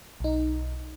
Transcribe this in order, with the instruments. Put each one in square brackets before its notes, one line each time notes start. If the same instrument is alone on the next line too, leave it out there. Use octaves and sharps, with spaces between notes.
[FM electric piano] B1 D#4